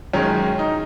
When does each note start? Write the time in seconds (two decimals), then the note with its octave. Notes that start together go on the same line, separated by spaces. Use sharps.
0.13 F#2 D#3 G#3 C#4
0.59 D#4